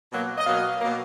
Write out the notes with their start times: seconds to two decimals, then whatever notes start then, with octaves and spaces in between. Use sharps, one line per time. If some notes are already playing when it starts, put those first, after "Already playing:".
0.11 B2 F#3 A#3
0.38 D#5
0.45 B2 F#3 A#3 F5
0.81 B2 F#3 A#3